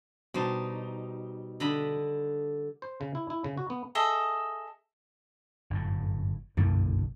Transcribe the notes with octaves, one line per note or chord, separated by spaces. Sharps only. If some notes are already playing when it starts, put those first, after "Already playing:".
B2 G3 D#4 C5 A5
D3 D#5 B5
C5
C#3
E4
E4
C#3
F#4
B3
G#4 A4 D#5 E5
G1 F#2 A2
F#1 B1 G2 D3